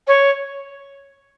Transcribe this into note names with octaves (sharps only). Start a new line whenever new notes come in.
C#5